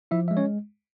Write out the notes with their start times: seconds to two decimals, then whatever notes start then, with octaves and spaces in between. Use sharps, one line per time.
0.11 F3 E4 E5
0.28 G#3 E5
0.37 C#4 C#5